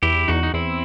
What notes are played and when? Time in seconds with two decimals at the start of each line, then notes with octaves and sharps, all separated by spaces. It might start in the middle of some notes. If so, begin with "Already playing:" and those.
0.03 E2 E4 G4
0.28 E2 D#4 F#4
0.43 D#4
0.54 E2 C4 E4